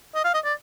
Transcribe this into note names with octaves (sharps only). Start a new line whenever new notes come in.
D#5
F5
D#5
D5